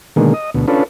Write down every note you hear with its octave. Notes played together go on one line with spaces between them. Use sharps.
B2 D3 D#3 G#3 A#3
D#5
D2 B2
C#4 D4 F4 A4 B4